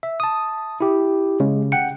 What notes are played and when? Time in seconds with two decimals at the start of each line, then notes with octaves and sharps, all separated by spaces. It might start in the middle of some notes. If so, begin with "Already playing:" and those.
0.03 E5
0.20 A5 D#6
0.80 E4 G4
1.40 C#3 G#3
1.72 F#5 G5 C#7